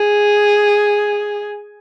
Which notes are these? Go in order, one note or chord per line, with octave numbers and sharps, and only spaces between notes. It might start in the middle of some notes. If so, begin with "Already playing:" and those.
Already playing: G#4